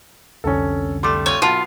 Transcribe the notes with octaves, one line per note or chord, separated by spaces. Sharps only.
C2 F2 D3 C#4 A4
G3 A3 C6 D6
C4 F4 C#5 G#5
B1 B3 F4 A5 F7